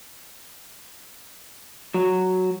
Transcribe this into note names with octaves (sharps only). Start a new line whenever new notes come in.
F#3